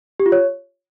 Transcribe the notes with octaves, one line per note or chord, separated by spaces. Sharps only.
G4
F4
C#5